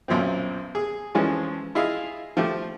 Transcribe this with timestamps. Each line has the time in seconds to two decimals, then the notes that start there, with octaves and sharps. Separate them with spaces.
0.08 B1 F#2 A#2 C4
0.75 G#4
1.15 F2 E3 F3 G#3 C#4
1.75 E4 F4 G#4 D#5 F5
2.37 F3 A3 G4